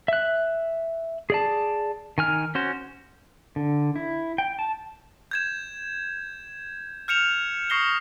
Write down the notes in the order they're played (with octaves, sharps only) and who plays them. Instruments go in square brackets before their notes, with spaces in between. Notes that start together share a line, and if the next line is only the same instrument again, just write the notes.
[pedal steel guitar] E5 F#6
G#4 D5 A5
D#3 G#5 F6
C#4 F#4 C5
D3
E4
G5
A5
[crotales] G6 G#6 E7
F6 G6 C#7 E7 F7
C#6 D#6 A#6 C7 G7